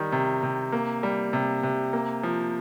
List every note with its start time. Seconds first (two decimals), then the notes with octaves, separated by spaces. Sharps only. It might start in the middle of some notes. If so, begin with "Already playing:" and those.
Already playing: D#3 G3
0.12 C3
0.43 C3
0.72 A#3
1.03 G3
1.33 C3
1.63 C3
1.93 A#3
2.23 F3